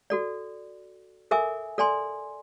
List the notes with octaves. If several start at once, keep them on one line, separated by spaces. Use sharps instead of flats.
F#4 A4 D5
A4 A#4 E5 G#5 D6
A4 D5 G#5 C6